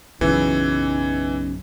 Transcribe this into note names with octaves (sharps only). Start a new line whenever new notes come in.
B1 F#2 C#3 E3 D#4